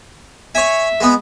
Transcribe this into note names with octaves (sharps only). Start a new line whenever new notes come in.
C#5 E5 G#5
G#3 B3